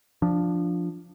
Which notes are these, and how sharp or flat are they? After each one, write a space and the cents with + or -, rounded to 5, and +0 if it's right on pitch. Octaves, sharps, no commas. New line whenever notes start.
F3 +0 D4 +0